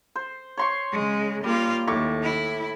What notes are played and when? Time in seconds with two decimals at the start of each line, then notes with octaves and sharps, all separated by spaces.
0.15 C5
0.57 C#5 C6 C#6
0.92 C#3 G#3
1.44 G3 A#3 F4
1.87 D#2 A2 C#6 D6
2.23 E4